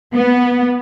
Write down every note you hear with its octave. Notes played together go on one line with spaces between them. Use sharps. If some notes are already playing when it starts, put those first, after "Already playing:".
B3